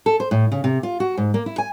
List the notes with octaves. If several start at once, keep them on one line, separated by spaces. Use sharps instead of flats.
A4
C5
A2
C#3
C3
F4
F#4
G#2
A#3
E4
G#5